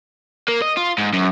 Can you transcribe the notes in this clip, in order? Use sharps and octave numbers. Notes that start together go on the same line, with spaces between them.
A#3
D#5
F4
G#2
F#2